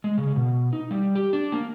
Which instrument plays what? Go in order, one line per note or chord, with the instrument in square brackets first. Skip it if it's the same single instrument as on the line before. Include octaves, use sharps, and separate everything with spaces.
[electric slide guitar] G#3
C#3
B2
D#4
G3
G4
D4
A#3